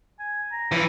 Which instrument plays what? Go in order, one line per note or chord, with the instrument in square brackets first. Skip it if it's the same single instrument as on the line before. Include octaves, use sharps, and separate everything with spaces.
[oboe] G#5
A#5
[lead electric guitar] E3 F3